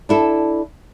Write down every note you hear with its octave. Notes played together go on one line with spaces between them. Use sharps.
D4 E4 A4